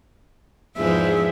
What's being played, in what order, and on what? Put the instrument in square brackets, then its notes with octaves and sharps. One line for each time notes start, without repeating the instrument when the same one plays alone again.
[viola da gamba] E2 G#2 F3 [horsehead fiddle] G#4 E5